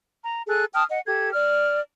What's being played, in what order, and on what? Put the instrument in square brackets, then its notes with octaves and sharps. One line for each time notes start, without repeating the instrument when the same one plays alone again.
[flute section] A#5
G#4 A4 F#6
G5 A5 D#6 F6
D#5 F#5
G4 A4 G#6
D5 F6